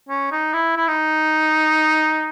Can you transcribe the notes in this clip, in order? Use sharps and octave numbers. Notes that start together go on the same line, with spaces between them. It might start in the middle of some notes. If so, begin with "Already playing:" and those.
C#4
D#4
E4
E4
D#4